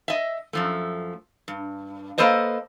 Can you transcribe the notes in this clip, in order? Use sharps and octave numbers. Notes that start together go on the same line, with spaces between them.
D#5 E5
F#2 F3 A3
G2
A#3 A4 B4 C5 D#5